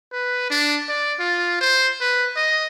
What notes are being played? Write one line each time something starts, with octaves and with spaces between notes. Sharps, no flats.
B4
D4
D5
F4
C5
B4
D#5